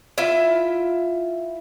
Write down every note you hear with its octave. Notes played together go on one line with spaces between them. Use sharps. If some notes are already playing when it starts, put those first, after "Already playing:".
E4 F4 E5